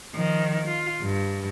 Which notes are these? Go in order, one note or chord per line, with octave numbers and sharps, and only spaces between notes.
D#3 F3
F4
G2